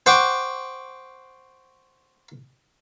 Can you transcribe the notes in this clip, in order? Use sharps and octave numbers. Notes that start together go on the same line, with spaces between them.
C5 F#5 G5 C#6 D6